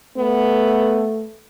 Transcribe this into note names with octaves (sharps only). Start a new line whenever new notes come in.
A3 B3